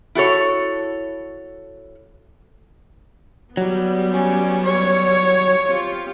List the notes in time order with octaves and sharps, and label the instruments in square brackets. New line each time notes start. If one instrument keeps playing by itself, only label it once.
[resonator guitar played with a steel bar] E4 F#4 A4 C#5
[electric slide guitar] F#3 [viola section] G3 B3
[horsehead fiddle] C#4
C#5
[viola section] C4 F4 G4